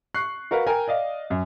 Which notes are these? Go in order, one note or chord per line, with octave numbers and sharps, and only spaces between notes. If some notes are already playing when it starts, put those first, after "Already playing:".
C#6 F#6 C7
F#4 A#4 B4 F5
A#4 G5 G#5 A#5
D5 D#5 F5
F#2